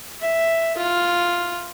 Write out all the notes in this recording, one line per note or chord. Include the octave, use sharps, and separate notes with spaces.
E5
F4